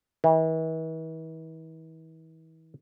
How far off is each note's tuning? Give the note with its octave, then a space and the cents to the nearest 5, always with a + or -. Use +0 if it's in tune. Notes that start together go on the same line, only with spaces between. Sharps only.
E3 -40